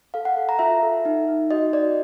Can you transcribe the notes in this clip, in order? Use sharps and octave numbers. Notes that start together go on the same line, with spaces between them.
A4 F5
F#5
A4
A#5
F4 E5
A4
D#4
D#4
F#4 D#5
F#4 D5